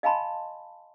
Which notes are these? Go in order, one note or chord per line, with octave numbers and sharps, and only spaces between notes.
D#5 F5 G#5 A5 B5 C6